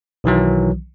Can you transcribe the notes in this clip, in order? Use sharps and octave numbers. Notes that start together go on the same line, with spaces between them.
B1 D#3 E3 F#3